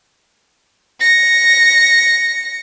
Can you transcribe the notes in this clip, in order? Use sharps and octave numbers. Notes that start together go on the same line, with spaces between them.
A#6 C#7